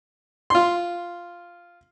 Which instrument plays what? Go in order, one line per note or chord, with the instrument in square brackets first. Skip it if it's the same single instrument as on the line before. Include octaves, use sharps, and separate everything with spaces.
[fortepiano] F4 C6